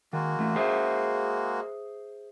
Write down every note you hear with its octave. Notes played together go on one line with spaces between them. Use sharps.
D#3 G#3 A#3 F#4
E3 A3
G#4 C5 E5